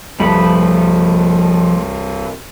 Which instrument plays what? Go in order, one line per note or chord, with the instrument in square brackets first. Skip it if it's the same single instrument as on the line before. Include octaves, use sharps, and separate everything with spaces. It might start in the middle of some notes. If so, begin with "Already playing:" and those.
[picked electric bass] C2 G2 G3 [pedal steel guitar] F3 A3 B5